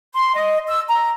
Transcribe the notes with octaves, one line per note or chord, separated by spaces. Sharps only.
C6
D#5
E6
A#5